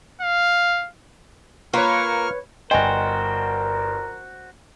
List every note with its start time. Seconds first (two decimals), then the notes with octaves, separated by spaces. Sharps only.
0.21 F5
1.74 A#3 F4 B4 C#5 C#6 F6
2.71 G1 F#4 A#4 C5 D#5 G5 G#5 B5